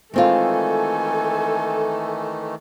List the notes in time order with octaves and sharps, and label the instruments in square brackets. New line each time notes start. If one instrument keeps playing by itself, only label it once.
[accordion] D#3 E3 A3 [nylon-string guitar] G#3 C4 F4 [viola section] A4 [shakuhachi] G#5